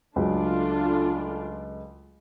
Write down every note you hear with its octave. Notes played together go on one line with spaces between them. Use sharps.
C#2 F#3 A3 D4 F4